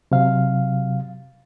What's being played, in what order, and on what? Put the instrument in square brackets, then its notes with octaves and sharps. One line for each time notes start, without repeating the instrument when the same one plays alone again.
[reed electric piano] C3 F#3 F5